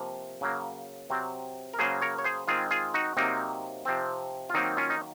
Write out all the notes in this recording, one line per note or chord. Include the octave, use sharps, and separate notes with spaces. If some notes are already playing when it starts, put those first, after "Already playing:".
Already playing: C3 F3 A#3 C5
C#3 F#3 A#3
C3 F#3 C4
A#4
C#3 F#3 A#3 G#4 C5
A#4 C#5
C#5
G#4 C5
D#3 G#3 C4 F4 G#4
F4 G#4
D#4 F#4
C3 F#3 A#3 C4 D#4
C3 F3 C4
F4
D#3 F#3 A#3 C4 D#4
C#4 F4
D#4